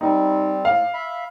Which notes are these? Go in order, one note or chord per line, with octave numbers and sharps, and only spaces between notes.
G3 C4 D#4
A2 F5
E5 B5